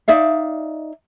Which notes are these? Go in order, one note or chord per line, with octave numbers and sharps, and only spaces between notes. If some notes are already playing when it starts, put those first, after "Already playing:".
D#4 D5 E5 F5